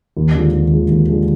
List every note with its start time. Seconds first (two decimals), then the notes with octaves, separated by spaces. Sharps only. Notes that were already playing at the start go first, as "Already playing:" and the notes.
0.17 D#2
0.35 D3 F3 G#3
0.54 D#2
0.73 D3 F3 G#3
0.90 D#2
1.09 D3 F3 G#3